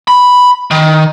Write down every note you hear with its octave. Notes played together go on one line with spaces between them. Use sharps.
B5
D#3